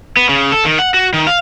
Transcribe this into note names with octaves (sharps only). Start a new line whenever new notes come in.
B3
C#3
A4
D#3
F#5
F#4
D#3
F5